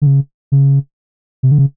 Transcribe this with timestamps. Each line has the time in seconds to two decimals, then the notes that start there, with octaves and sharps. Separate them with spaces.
0.02 D3
0.07 C#3
0.52 C#3
1.43 C3
1.51 D3
1.58 C#3